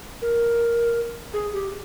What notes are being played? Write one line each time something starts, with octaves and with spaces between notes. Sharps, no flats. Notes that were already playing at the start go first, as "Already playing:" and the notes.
A#4
G#4
G4